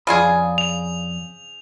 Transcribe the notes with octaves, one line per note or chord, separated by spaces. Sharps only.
F2 C#3 F4 G#4 D5 B5
F7